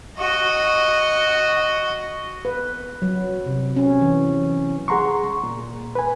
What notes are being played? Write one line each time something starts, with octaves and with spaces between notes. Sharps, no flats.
F#4 D#5
B4
F#3
C3
C#4
E3
G#4 F#5 A#5 C6 C#6
A#2
B4 G#5